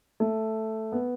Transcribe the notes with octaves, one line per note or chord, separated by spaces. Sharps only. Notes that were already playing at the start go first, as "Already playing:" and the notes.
A3
B3